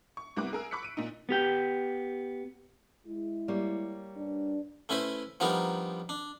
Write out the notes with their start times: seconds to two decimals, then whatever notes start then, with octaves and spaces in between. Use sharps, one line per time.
0.17 C#6
0.37 C2 G3 B3 A#4 D6 F#6
0.53 G#4 A#4 E6
0.71 B5 C#6 D6 F#6 B6 C#7
0.83 D7 D#7
0.97 A#2 D#4
1.29 B3 G4 G5
3.07 G#3 E4
3.48 G3 A#3 C#5
4.15 G2 D4
4.89 A3 C#4 E4 B4 C5
5.40 F3 G3 B3 D4 D#4 A#4
6.09 D4